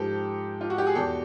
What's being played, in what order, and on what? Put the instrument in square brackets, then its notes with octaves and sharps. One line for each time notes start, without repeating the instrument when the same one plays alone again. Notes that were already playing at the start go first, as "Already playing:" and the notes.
Already playing: [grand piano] G#2 F3 G4 A4
F4
F#4
G4
G#4
E2 B2 G4 A4